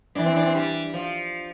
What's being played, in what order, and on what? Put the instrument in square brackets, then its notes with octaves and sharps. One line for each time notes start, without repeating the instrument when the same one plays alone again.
[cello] E3 [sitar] D4
[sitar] C4
D4
C4
G3
F3